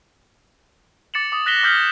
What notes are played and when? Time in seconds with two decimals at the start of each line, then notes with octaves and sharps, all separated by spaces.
1.14 D6 A6 C#7 E7 F#7
1.32 D6 D#6
1.46 F#6 A#6 B6 E7 G7
1.63 D6 F6 G6 B6 F#7 G7